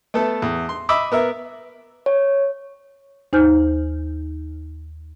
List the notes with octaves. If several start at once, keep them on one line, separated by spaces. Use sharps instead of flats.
A3 B3 A4
E2
C6
D#5 E5 B5 D6 E6
B3 A#4 E5
C#5
D#2 D#4 C5 G#5 F6 G6